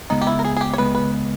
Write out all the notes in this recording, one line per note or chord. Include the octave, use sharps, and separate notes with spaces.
C#2 C#3 G#3 B3 D#4
G4
E4
A#4
G#4
G#4
G4
C#5
C#2 C#3 G#3 B3 B4
B4